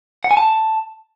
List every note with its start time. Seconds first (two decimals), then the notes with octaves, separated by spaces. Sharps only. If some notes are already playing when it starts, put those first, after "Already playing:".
0.24 F#5
0.31 G#5
0.37 A5